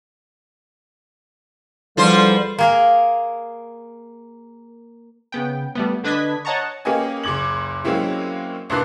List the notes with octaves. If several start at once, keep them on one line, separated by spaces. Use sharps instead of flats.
E2 D3 F3 G3 C5
A#3 G#4 A#4
C#3 B3 G5
G3 A3 B3
D3 D4 B4 D#5 G#6 B6
C#5 D#5 F#5 A5 A#5 C#6
A#3 C#4 G4 B4 D#5 G#5
F#1 C#2 D6 G#6 F#7
F#3 G#3 A#3 C4 C#4 E4
C2 A#2 D4 B4 F#6 C7